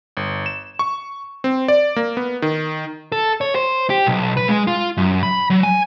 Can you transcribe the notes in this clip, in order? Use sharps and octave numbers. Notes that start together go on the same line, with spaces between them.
G1
E7
C#6
C4
D5
A#3
B3
D#3
A4
C#5
C5
G4
B1
B4
G#3
F4
F#2
B5
F#3
G#5